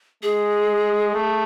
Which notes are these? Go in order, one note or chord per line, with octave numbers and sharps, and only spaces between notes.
G#3 G#4
A3